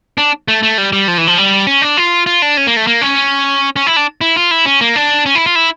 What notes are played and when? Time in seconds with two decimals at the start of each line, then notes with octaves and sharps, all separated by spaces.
0.18 D4
0.48 A3
0.63 A3
0.78 G3
0.93 G3
1.08 F3
1.18 E3
1.27 F3
1.38 G3
1.67 C#4
1.82 D4
1.97 F4
2.26 F4
2.42 D4
2.57 C#4
2.67 A#3
2.77 A3
2.87 A#3
3.01 C#4
3.76 C#4
3.87 E4
3.96 D4
4.21 E4
4.36 F4
4.51 E4
4.65 C#4
4.81 A#3
4.96 D4
5.26 C#4
5.35 E4
5.46 F4
5.55 E4